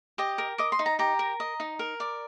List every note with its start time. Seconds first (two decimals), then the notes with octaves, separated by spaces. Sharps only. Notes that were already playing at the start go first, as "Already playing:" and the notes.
0.18 G4 D#5
0.38 A#4
0.58 D#5 D6
0.72 C6
0.79 D#4
0.86 A#5
0.99 G4 A#5
1.19 A#4
1.40 D#5
1.60 D#4
1.79 A#4
2.00 D5